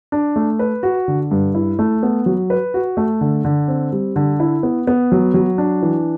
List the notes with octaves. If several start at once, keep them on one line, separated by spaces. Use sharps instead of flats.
D4
A3
B4
F#4
D3
G2
E4
A3
B3
F#3
B4
F#4
A3
D3
D3
C4
G3
D3
E4
B3
B3
F#3
F#3
D4
E3